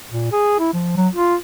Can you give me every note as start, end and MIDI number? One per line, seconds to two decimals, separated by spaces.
0.11 0.28 46
0.32 0.59 68
0.59 0.70 64
0.73 0.94 53
0.96 1.08 54
1.15 1.36 65